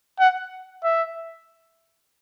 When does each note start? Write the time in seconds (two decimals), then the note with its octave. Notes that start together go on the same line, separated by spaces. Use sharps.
0.20 F#5
0.84 E5